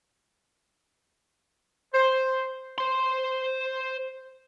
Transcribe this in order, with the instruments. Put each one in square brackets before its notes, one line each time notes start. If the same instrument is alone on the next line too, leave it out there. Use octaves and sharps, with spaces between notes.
[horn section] C5
[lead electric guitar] C5 C6